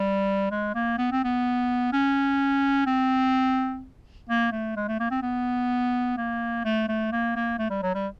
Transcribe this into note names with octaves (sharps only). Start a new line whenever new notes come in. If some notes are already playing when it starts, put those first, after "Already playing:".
Already playing: G3
G#3
A#3
B3
C4
B3
C#4
C4
A#3
A3
G#3
A3
A#3
C4
B3
A#3
A3
A3
A#3
A#3
A3
G3
F#3
G3